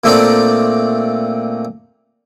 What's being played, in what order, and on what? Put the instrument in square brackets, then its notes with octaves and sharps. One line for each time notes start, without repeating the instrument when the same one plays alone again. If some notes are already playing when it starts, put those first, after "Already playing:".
[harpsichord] A#2 A3 C4 D4 D#4 D5